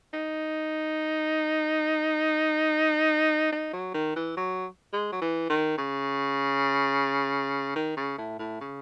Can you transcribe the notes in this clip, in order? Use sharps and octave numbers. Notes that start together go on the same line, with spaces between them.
D#4
D#4
F#3
D#3
E3
F#3
G#3
F#3
E3
D#3
C#3
D#3
C#3
A2
A2
C#3